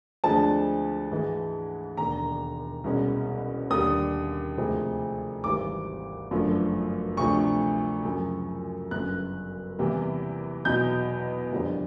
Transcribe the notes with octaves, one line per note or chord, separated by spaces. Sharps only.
D2 D3 F3 G#3 C4 A5
G#2 E3 G#3
E1 D#2 D3 A#5
C2 B2 G#3 C#4
D#2 D3 G3 D#6
D2 C3 F3 G#3 C4
G#1 G#2 E3 G3 C4 D6
G1 F#2 D3 F3 A3
D2 C3 F3 A3 D4 C#6
F#2 C#3 F3
G1 F#2 C#3 F#6
E2 C3 E3 G3 A#3
E2 B2 F#3 B3 D#4 G6
F#1 F2 D3 G3 C4